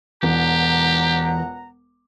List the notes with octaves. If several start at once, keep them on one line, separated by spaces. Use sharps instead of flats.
E1 C#2 E3 G4 F#5 A#5